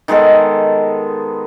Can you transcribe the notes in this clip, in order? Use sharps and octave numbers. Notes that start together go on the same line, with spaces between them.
D#3 G#3 B3 A4